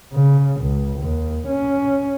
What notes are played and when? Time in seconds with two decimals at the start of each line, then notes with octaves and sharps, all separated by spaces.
0.13 C#3
0.61 C#2
1.00 D#2
1.48 C#4